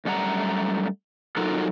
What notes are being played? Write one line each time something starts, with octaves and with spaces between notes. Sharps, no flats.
F#2 G3 A3 F#5 A#5
F#3 D#4 F4 F#4 A4 A#4